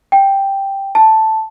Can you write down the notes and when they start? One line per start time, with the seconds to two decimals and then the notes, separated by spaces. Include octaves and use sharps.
0.12 G5
0.95 A5